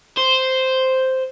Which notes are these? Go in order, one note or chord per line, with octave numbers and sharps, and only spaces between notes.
C5